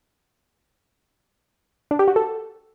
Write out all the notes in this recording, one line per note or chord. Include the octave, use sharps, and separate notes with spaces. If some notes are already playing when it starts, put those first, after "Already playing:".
D4
G4
F#4
A4